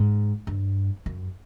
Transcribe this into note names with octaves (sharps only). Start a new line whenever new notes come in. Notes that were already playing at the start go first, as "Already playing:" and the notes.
Already playing: G#2
G2
F#2